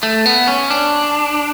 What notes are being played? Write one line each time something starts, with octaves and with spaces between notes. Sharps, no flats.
A3
B3
C#4
D4